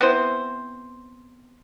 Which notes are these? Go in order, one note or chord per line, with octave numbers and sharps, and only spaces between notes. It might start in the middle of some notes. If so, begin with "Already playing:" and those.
B3 C4 E4 C5